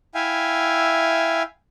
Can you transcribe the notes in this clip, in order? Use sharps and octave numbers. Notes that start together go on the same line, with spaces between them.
E4 E5 F5 G5 G#5